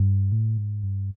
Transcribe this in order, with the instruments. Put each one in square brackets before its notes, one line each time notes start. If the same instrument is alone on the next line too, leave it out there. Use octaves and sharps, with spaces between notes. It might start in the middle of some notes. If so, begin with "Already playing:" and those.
Already playing: [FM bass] G2
A2
G#2
G2